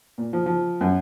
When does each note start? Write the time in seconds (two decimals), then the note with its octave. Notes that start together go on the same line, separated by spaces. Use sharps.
0.18 A#2
0.33 F3
0.46 F3
0.81 F#2